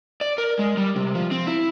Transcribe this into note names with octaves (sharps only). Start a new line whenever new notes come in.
D5
A#4
G#3
G3
C3
F3
C4
E4